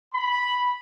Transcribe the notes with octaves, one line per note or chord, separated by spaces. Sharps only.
B5